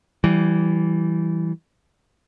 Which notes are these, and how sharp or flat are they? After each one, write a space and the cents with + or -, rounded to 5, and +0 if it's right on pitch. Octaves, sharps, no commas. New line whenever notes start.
E3 +0 G3 -25